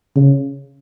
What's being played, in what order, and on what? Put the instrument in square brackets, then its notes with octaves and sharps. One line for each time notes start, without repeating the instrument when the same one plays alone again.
[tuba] C#3